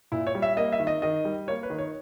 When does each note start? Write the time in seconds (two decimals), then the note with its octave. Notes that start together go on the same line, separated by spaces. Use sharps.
0.12 A#2 E4
0.27 C#5
0.35 G3
0.42 E5
0.57 A#3 D#5
0.72 E5
0.80 D#3
0.87 D#5
1.02 D#3 D#5
1.25 G3
1.48 A#3 C#5
1.63 B4
1.70 D#3
1.78 C#5